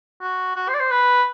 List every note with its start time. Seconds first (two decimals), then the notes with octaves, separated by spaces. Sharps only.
0.21 F#4
0.56 F#4
0.69 C5
0.74 D5
0.80 C5
0.91 B4